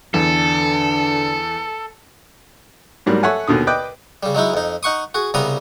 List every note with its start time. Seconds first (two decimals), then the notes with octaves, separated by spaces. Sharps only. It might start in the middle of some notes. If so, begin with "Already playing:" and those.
0.14 E2 D3 A4
3.06 G#2 F#3 G3 A#3
3.23 A4 C#5 E5 F#5 G#5
3.47 D#2 B2 D3 D#6
3.67 B4 D#5 G5 D6 F#6
4.23 C#3 G3
4.35 F#3 G#3 D#4 E4
4.54 F2 D#4
4.83 D#4 F#5 C#6 D#6
5.14 F#4 G#4
5.34 C2 C#3 G3 B3 A#5 D#6